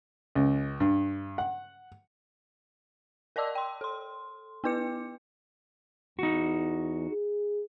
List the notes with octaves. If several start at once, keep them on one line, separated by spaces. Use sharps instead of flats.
C#2
G2
F#5
A#4 D5 D#5 A5 D6 E6
G5 C6
A4 C6
B3 E4 B4 D6 C#7
E2 D#4 F#4
G#4